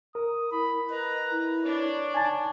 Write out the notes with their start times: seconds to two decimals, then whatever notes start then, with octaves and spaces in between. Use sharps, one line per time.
0.15 A#4 D#6
0.52 E4 B5
0.90 B4 D#5 A#5 F#6
1.31 E4
1.65 D4 C#5 D5
2.14 D#4 G#5 A5